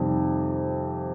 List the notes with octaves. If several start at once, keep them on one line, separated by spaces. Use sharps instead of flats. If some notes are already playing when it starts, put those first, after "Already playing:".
Already playing: F2 C3 D#3 G3